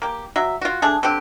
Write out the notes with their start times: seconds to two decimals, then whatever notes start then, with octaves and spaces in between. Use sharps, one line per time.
0.02 A#3 G4
0.36 F#3 E5
0.61 F4 F#4
0.82 A3 D4 G#4
1.03 D3 C4 G4